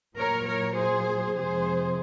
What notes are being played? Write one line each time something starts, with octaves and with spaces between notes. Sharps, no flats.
A#2 F#3 A#4 C#5
A#4 C#5
G#4 C5
F2 C3 F3 G#3 G#4 C5